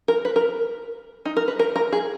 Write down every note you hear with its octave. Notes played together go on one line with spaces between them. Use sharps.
A#4
B4
A#4
D#4
A#4
B4
A#4
A#4
G#4